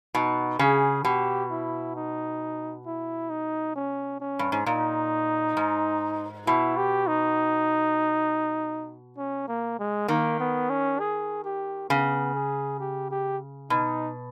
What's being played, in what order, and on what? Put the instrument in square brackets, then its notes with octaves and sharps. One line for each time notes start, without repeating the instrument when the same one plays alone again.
[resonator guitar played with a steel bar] B2 [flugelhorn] D#4
[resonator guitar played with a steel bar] C#3 [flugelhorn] G#4
[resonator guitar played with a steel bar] B2 [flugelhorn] G4
[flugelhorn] E4
D#4
E4
D#4
C#4
C#4
[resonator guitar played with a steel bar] G2
G#2
[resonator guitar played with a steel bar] A#2 [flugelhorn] D#4
[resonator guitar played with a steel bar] G#2
[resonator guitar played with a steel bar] B2 [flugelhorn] E4
[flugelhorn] G4
D#4
C#4
A#3
G#3
[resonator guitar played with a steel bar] D#3 [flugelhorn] A#3
[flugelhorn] B3
C#4
G#4
G4
[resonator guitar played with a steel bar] C#3 [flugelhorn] B3
[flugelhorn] G#4
G4
G4
[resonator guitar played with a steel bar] B2 [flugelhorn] D#4